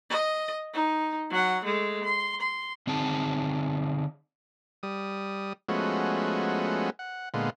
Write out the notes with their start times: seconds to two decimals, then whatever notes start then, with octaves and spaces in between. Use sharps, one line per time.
0.10 D#5
0.73 D#4
1.30 F#3 F#5
1.64 G#3 A3
2.04 C6
2.41 C6
2.87 D3 C4 D#4 G#4 A5
4.83 G3 D#6
5.69 F3 G#3 A3 B3 C#4 F#4
6.99 F#5
7.34 A#2 D3 G#3 B3 F4